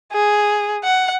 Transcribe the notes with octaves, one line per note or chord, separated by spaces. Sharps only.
G#4
F#5